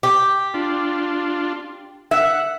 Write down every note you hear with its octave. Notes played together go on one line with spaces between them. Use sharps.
G4
D4 F4
E5 F#5